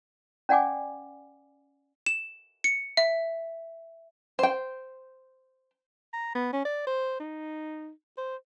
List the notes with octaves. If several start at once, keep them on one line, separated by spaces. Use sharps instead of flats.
C#4 D5 F#5 G#5 D6
E7
C#7
E5
C5 G5
A#5
B3
C#4
D5
C5
D#4
C5